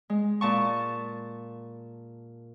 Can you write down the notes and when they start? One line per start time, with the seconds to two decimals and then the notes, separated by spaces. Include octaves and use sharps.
0.10 G#3
0.41 A#2 A5 C#6